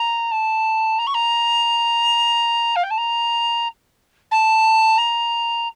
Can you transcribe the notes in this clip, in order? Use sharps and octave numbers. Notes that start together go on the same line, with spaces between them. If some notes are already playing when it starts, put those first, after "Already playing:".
Already playing: A#5
A5
A#5
C#6
A#5
F5
G5
A5
A#5
A5
A#5